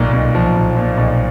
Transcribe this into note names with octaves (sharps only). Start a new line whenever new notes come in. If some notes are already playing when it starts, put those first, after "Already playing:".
Already playing: B1 A#2
B1
F3
B1
A#2
B1